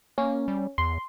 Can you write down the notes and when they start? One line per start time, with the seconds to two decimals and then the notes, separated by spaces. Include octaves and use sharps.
0.18 A#3 C#4
0.48 G3
0.78 E2 C6